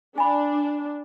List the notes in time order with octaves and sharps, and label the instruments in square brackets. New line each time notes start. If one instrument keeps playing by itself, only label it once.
[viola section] D4 [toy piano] G#5 B5